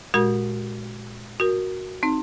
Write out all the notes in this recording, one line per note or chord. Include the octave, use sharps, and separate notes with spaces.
A#2 G#3 F#4 A#4
F#4 A#4
C4 D#4